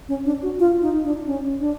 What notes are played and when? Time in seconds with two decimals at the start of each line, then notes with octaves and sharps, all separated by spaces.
0.09 C#4
0.25 D4
0.43 F#4
0.59 F4
0.82 D#4
1.04 D4
1.26 C#4
1.60 D4